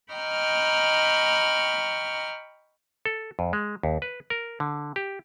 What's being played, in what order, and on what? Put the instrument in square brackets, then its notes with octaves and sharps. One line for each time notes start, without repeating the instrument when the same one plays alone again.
[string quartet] D#5 G5 A#5 B5 C#6 F6
[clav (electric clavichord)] A4
F2
G#3
D#2
B4
A#4
D3
G4